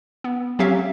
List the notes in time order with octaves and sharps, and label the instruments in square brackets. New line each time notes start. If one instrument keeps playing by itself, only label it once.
[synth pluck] B3
F#3 C4 C#4 G4 E5 F5